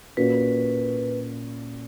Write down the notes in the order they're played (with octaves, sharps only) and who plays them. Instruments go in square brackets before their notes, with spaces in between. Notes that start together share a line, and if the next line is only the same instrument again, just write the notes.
[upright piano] A#2 A#3 C#4 F#4 [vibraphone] B4